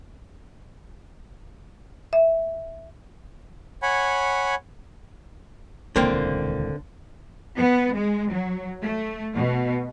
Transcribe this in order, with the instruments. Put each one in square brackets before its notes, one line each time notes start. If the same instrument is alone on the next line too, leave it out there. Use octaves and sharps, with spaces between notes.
[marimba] E5
[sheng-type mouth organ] C#5 F#5 G#5 B5
[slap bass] D#1 C#2 E3 [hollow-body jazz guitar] D3 A#3 C4
[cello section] B3
G#3
F#3
A3
B2